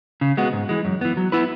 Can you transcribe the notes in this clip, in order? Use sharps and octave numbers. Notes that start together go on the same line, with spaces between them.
C#3
G#3 B3 F#4
G#2
E3 G#3
F#2
E3 B3
F#3
B3 E4 B4